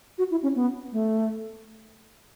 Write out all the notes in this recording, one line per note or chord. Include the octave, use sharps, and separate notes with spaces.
F#4
E4
C#4
B3
A3